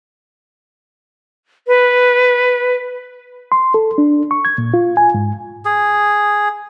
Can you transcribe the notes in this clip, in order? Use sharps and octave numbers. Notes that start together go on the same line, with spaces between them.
B4
C6
A4
D4
C#6
G#6
A#2
F4
G#5
G#2
G#4